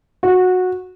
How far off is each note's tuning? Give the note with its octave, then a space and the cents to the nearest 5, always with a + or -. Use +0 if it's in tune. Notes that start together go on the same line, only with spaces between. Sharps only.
F#4 -15